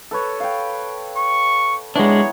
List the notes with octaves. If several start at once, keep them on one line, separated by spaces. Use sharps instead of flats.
A4 B4 C#5
F5 G5
C#6
E3 F#3 G#3 B3 D4 C#5